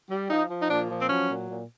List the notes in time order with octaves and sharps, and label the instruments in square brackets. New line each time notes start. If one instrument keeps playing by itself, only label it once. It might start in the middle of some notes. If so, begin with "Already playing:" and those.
[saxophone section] G3
F3 D#4
F3
D#4
A#2 D4
F3
C4
F#3 C#4
A#2
A#2